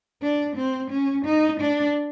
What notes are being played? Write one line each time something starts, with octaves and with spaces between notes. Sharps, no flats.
D4
C4
C#4
D#4
D4